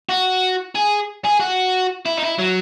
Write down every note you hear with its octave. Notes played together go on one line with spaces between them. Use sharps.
F#4
G#4
G#4
F#4
E4
D#4
E4
F#3